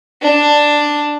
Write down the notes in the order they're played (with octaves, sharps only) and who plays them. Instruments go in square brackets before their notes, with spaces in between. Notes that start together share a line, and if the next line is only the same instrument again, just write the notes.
[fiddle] D4